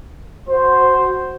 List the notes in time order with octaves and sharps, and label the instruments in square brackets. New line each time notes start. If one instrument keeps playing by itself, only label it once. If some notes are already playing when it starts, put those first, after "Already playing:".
[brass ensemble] F#4 C5